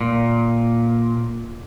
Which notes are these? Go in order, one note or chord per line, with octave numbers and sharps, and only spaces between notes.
A#2